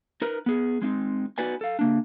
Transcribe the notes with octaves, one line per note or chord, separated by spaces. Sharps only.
D#4 A#4 B4
B3 G#4
G#3 C4 D#4
B3 D#4 F#4 B4 D5 G#5
A4 F5
C#3 A#3 D4